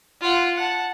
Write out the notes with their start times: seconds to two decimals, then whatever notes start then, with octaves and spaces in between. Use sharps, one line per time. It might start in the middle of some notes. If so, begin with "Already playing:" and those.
0.21 F4 F#5
0.57 F#5 A5